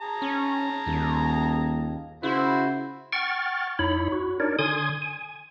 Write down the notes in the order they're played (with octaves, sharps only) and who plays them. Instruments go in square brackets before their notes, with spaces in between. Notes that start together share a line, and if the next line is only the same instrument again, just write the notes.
[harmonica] G#4 A5 A#5
[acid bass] C#4
[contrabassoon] D#1 [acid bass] D#2
[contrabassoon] C#3 [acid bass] E4 [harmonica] F#4 C5
[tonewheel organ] F#5 G5 C#6 F6 A6
F2 D#4 E4 C#5 B5
F#4
D4 D#4 A#4 C#5 D5
D3 G#5 C6 D#6 G#6
G#5